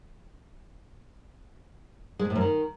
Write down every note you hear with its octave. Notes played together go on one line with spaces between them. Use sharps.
G#3
B2
A2
F#2
D#3